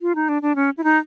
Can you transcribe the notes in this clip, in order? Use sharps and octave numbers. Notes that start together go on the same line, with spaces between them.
F4
D#4
D4
D4
C#4
E4
D#4